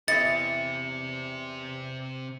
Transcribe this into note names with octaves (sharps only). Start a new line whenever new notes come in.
E2 C3 E3 G4 D#5 A6 C#7